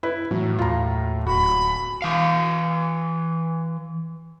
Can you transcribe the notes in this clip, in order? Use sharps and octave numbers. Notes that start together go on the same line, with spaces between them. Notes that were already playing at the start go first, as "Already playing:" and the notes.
E4 B4
A2 E3 F#3
D#2 F4 A#5
D1 F#4 B5
E3 F5